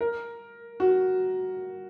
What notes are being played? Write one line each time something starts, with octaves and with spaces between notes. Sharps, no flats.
A#4
F#4